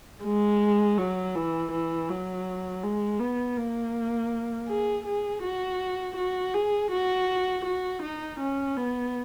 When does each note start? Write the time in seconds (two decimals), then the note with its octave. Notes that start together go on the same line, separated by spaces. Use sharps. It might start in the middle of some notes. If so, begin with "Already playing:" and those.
0.24 G#3
0.98 F#3
1.35 E3
1.72 E3
2.09 F#3
2.83 G#3
3.20 B3
3.57 A#3
4.68 G#4
5.06 G#4
5.43 F#4
6.16 F#4
6.54 G#4
6.91 F#4
7.65 F#4
8.02 D#4
8.40 C#4
8.77 B3